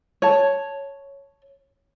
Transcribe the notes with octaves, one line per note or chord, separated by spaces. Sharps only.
C#5 A5